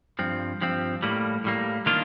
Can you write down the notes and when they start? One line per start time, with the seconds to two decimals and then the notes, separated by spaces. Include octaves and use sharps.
0.19 G2 F3 C4
0.61 G2 F3 C4
1.03 A2 G3 A#3
1.44 A2 G3 A#3
1.86 D#3 A#3 D4 F4